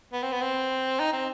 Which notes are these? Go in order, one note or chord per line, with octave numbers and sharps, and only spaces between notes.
B3
C4
B3
C4
D#4
C4